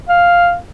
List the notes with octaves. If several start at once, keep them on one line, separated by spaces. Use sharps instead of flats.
F5